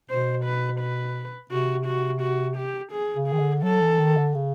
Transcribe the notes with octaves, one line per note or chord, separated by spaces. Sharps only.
B2 C5
B4
B4
C3 F#4
F#4
F#4
G4
G#4
C#3
D#3 G#4
D3
F#3 A4
E3
D#3
D3
C#3